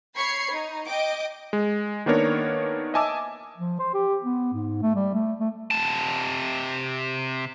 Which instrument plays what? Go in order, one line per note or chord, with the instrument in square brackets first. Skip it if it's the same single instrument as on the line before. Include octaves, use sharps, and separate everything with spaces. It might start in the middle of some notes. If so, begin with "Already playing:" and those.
[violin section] C#5 B5 C#6 G#6 C7
D#4
D#5 G5 D6
[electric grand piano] G#3
D#3 A#3 B3 D4 A#4 C#5
D#5 E5 G#5 A5 D6 E6
[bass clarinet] F3
C5
G4
B3
G#2
A3
G3
A3
A3
[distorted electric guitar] C3 A5